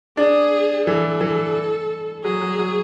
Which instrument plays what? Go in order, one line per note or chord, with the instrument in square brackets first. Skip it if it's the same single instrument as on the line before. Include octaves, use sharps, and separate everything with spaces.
[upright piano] D4 [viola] G#4
[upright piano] E3 [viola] A4
[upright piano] E3
[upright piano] F#3 [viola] G#4
[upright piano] F#3
F#3